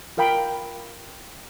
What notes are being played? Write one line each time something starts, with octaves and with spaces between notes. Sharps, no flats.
F4 A#4 F5 G5 B5